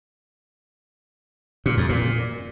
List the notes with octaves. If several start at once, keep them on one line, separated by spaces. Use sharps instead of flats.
A#2
F2
A#2